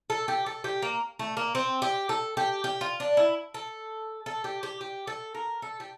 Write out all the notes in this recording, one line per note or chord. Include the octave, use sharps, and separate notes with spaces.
A4
G4
A4
G4
A#3
A3
A#3
C4
G4
A4
G4
G4
F4
D4
E4
A4
A4
G4
G4
G4
A4
A#4
A4
G4